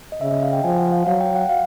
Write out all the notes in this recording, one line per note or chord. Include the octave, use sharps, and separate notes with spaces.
D#5
C#3 E5
D#5
F5
G5
F3 G#5
F#5
F5
F#3 F5
G5
F#5
F5